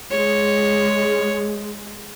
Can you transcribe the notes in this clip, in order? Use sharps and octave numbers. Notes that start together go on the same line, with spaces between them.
G#3 C#5